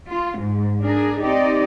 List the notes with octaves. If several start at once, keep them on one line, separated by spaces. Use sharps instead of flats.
F4
G#2
D4 G#4 A#4
C4 D#4 G4 D5 D#5